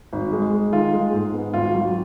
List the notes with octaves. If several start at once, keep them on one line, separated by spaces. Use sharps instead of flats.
G#1
G#3
G#3
D#3 F4
G#3
G#2
B3
G#1 F4
F#3